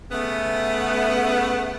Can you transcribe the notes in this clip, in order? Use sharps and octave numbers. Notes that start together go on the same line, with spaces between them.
C#3 A3 B3